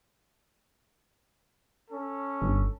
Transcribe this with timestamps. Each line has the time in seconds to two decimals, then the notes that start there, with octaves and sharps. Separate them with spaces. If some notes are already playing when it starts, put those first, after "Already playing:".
1.91 C#4 A4
2.42 G1